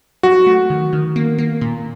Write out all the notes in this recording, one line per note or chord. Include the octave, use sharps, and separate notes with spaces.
F#3 F#4
A3
D#3
D#3
A#3
A#3
A#2